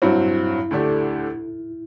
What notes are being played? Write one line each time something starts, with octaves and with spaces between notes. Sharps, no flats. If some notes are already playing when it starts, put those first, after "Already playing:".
G2 F#3 C4 E4 F#4
D2 D3 A3 D4 G4